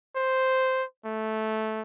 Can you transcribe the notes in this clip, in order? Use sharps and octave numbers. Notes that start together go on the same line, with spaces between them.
C5
A3